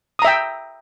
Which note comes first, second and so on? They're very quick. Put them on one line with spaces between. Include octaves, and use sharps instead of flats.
D#6 A#5 E5 G5